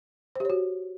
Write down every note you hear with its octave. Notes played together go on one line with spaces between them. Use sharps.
F#4 G4 C5 C#5